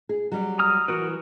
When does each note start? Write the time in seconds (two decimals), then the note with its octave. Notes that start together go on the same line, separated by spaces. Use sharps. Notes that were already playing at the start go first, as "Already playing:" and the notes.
0.09 G#4
0.32 F#3 G3
0.59 A#5 D#6 F6
0.88 E3 F#4 A#4 B4